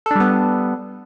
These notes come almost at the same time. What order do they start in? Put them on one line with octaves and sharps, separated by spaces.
A4 D4 G3 B3